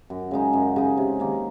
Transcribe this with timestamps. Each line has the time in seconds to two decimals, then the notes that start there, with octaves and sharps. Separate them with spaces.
0.10 F#2
0.31 C#3 G#3 D#4
0.53 F#2
0.76 C#3 G#3 D#4
0.98 C3
1.20 D#3 A#3